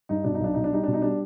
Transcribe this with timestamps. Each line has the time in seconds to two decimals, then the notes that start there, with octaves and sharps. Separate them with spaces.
0.09 G2 D#4
0.24 B2 D4
0.34 D#4
0.40 B1 D4
0.54 B2 D#4
0.64 D4
0.73 G3 D#4
0.84 B2 D4
0.93 D#4
1.02 G3 D4